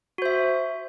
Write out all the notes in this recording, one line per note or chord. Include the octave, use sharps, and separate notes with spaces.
F#4 C5 E5